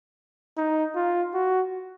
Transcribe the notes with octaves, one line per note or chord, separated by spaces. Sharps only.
D#4
F4
F#4